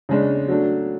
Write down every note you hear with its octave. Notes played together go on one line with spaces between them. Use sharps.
C#3 G#3 D4
F#3 A3 D4